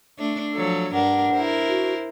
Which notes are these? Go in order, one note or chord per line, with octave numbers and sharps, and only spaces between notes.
A3 D4
F3 F#3 A4
G2 D4 A#4 F#5
E4 A#4 C5
F#4